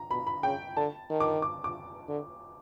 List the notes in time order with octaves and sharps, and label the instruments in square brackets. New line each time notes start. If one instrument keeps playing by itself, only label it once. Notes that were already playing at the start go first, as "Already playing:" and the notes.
Already playing: [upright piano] A#5
[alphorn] B2 [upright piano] B5
[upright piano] B5
[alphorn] C#3 [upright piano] G5
[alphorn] D3 [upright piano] A5
[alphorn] D#3
[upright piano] D6
D6
D6
[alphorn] D3